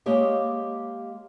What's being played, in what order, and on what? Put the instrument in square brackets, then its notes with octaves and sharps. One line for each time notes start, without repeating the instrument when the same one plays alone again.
[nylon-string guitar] G#3 A#3 G4 C#5 D#5